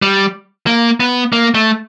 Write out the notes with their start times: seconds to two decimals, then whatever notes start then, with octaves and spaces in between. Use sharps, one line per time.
0.02 G3
0.67 A#3
1.00 B3
1.33 A#3
1.55 A3